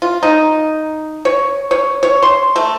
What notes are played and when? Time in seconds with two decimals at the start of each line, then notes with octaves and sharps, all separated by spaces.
0.02 F4
0.23 D#4
1.25 C#5
1.71 C#5
2.03 C#5
2.22 C6
2.56 A3